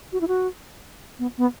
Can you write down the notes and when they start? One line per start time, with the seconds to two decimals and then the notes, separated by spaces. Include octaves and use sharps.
0.13 F#4
0.21 E4
0.28 F#4
1.19 B3
1.37 B3